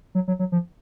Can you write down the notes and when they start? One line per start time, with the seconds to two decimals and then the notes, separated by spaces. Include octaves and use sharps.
0.15 F#3
0.28 F#3
0.39 F#3
0.52 F3